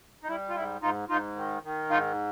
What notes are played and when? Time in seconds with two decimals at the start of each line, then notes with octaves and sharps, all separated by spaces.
0.23 D#4
0.28 G3 E4
0.49 F4
0.55 G#2 E4
0.82 G#2 D#4 F4
1.09 G#2 D#4 F4
1.36 D#3
1.63 D#3
1.90 G#2 D#4 F4